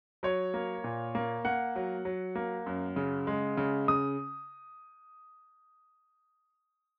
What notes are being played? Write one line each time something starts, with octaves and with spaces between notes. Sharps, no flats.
F#3 C#5
A#3
A#2
A#3
A#3 F#5
F#3
F#3
A#3
F#2
C#3
G#3
C#3
C#3 D#6